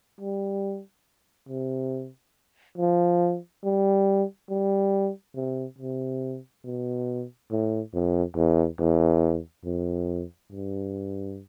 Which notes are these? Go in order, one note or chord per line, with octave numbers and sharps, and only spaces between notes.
G3
C3
F3
G3
G3
C3
C3
B2
A2
F2
E2
E2
F2
G2